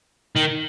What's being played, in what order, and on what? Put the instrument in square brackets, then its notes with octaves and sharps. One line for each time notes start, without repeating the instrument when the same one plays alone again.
[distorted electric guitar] D#3